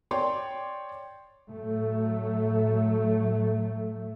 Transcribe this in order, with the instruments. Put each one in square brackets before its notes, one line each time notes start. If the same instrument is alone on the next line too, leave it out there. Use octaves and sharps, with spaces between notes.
[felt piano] C#5 D5 G5 C6
[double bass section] A2 F#3 A3